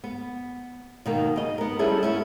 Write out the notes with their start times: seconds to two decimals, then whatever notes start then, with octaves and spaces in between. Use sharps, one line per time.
0.04 B3
1.06 B2 D#3 A#3
1.36 C#3 D#5
1.58 B3 A#4
1.79 G3 C#4 E4 G#4 A4
2.03 B3 C#4 E4